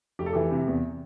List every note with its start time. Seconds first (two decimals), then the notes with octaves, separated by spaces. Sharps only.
0.19 F1 G4
0.26 A4
0.33 E3 G4
0.51 C3
0.67 E2